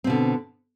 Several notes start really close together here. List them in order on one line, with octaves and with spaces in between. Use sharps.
C4 B2 D3